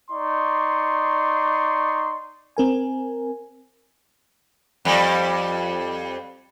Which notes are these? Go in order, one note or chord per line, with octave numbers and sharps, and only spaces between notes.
D#4 D5 C6 C#6
C4 A#4 G#5
F2 G3